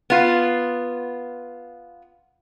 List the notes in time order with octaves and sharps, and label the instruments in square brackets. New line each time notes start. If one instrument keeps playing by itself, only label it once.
[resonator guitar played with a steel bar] B3 F4